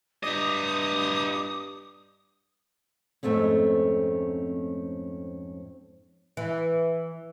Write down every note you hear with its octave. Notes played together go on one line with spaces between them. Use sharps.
G2 E4 D#5 D6 D#6
F2 G#2 A3 C4 C#4
E3